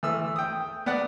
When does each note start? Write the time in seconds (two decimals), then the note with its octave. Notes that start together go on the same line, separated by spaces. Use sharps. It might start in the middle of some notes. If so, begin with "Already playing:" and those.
0.03 E3 A3 E6
0.36 G5 D#6
0.86 B3 D5 F#5